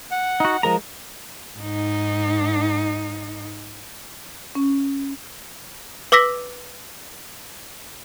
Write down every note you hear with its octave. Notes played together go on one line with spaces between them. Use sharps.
F#5
D#4 F#4
F3 G#3 A#4 A#5
G#2 D#4
C#4
B4 D6 E6 A#6 B6